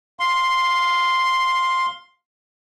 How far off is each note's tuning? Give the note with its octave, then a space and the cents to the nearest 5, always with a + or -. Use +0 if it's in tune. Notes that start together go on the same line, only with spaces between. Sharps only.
F5 +10 C6 +0